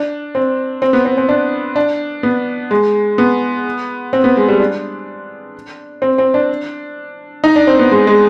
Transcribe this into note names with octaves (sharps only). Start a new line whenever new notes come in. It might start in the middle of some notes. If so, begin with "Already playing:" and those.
Already playing: D4
C4
C4
B3
C4
C4
D4
D4
B3
G#3
B3
C4
B3
G#3
G3
D4
C4
C4
D4
D#4
D4
C4
B3
G#3
G#3